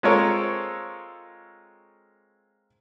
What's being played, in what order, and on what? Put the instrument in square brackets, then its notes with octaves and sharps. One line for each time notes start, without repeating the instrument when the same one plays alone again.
[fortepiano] G#3 C4 F4 A4 A#4 C#5